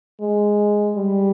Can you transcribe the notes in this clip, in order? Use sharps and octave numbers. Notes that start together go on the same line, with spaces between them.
G#3
G3